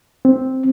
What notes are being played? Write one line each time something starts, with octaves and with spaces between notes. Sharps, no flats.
C4